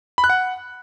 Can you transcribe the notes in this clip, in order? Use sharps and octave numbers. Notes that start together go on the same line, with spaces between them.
B5
F#6
F#5